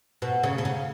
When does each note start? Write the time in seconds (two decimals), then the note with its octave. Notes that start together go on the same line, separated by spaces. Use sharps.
0.22 B2
0.43 C#3
0.58 B2
0.65 C#3